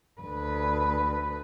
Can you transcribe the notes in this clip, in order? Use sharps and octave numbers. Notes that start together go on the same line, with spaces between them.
D2 B4